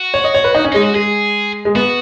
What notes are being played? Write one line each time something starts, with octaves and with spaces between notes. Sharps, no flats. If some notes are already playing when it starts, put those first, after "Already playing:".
Already playing: F#4
C#5
D#5
C#5
B4
D#4
C#4
G#3 D#4
F#4
G#3 G#4
G#3
B3 F#4